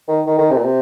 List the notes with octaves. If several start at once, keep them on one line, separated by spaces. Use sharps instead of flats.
D#3
D#3
D#3
C3
A#2
C3